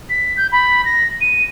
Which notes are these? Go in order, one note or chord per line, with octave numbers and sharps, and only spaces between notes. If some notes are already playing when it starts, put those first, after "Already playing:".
B6
G6
B5
A#6
D#7